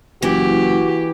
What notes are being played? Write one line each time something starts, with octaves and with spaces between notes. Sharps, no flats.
F#1 E3 F#4 G4